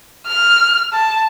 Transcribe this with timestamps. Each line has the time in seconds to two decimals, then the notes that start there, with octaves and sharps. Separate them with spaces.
0.28 F6
0.93 A5